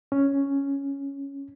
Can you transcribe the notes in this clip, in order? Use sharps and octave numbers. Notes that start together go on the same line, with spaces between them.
C#4